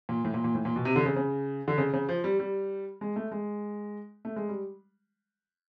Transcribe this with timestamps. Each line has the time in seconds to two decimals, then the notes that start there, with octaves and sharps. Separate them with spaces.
0.09 A#2
0.25 A2
0.34 A#2
0.44 A#2
0.55 A2
0.65 A#2
0.76 B2
0.85 C3
0.96 D3
1.06 C#3
1.16 C#3
1.68 D3
1.78 C#3
1.93 C#3
2.09 F3
2.24 G3
2.39 G3
3.01 G#3
3.16 A3
3.31 G#3
4.25 A3
4.36 G#3
4.49 G3